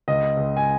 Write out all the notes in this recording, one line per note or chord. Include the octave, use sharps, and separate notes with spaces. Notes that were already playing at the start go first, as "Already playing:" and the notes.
C#2 D#5
C#2
G#5